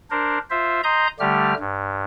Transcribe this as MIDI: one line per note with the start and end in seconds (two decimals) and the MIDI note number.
0.11 0.38 62
0.11 0.38 70
0.11 0.38 72
0.50 0.81 65
0.50 0.81 72
0.50 0.81 76
0.84 1.07 75
0.84 1.07 82
0.84 1.07 84
0.84 1.07 87
0.84 1.07 91
1.20 1.54 50
1.20 1.54 55
1.20 1.54 57
1.20 1.54 67
1.20 1.54 89
1.59 2.05 43